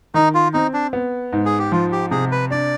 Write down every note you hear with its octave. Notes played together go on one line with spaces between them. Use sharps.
D#3 D#4
F4
C4 D#4
D4
B3
G#2
G#4
G4
F3 F4
G4
C3 G#4
B4
D4 D5